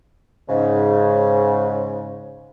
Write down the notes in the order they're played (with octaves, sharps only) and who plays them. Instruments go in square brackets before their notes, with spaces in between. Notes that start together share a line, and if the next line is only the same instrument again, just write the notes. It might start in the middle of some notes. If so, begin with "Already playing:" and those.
[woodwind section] G#2 C#3